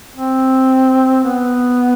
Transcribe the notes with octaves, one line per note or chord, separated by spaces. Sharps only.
C4
B3